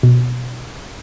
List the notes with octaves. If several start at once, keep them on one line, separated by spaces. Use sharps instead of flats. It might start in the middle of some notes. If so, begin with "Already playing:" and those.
B2